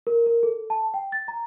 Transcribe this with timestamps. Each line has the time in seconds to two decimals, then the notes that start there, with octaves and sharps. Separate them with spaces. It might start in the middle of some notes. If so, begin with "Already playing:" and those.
0.07 A#4
0.26 A#4
0.43 A4
0.70 A5
0.94 G5
1.12 A6
1.28 A#5